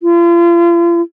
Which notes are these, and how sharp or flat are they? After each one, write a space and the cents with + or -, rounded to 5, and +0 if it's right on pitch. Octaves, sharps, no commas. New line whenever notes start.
F4 -40